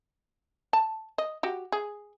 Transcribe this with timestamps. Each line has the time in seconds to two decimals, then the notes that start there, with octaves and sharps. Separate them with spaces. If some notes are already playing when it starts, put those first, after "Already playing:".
0.73 A5
1.18 D#5
1.43 F#4 G4
1.72 G#4